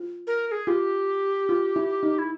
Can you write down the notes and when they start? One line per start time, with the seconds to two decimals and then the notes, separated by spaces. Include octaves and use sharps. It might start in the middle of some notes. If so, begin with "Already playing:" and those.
Already playing: F4
0.27 A#4
0.47 A#4
0.52 G#4
0.67 F4 G4
1.49 F4
1.76 E4
2.03 D#4
2.18 E4